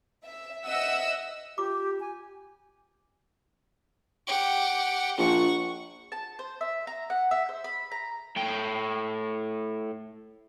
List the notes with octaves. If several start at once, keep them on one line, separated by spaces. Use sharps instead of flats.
E5
D#5 E5 F#5 E6
F4 G4 D6
G#5
G4 F#5
A#1 F#5 C#6
A5
C5
E5
A#5
F#5
E5
C5
B5
A#5
A2 G5